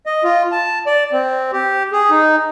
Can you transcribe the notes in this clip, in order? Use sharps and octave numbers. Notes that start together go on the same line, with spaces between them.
D#5
F4
A5
D5
C4
G4
G#4
D#4